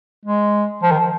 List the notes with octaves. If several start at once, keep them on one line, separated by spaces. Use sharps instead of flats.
G#3
F3
D#3
F3